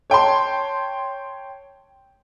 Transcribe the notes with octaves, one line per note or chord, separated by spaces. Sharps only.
C#5 G5 A5 C6